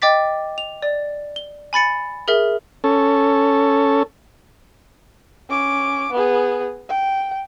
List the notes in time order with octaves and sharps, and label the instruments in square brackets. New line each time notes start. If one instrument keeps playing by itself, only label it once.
[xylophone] D#5 G5 D6 A6 B6
F7
D5
G7
G#5 B5 A6 C#7
G#4 A#4 E5
[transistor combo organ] C#4 A4
[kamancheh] C#4 D6
B3 G#4
G5